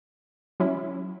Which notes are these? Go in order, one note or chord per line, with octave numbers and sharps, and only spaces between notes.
F#3 C#4 E4